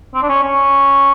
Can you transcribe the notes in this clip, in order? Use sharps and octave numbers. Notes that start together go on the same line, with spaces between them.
C4
D4
C#4
C#4